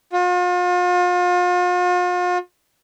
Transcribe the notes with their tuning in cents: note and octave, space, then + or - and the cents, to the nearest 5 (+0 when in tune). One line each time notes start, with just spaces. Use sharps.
F4 +40